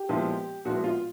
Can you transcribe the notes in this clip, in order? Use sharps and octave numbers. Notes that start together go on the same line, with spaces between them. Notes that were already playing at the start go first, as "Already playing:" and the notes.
Already playing: G4
A#2 F3 G#3 B3 E4
A#2 F3 G#3 B3 E4 F#4
F4